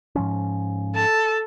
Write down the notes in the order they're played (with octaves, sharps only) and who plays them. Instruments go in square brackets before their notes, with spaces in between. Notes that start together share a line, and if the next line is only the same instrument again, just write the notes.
[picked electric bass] G#2 F3 C#4
[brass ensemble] A4 [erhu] A5